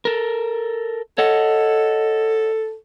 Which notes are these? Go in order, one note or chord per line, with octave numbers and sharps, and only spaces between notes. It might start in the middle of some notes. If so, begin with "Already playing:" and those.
A4 A#4
A4 C#5 D#5 F#5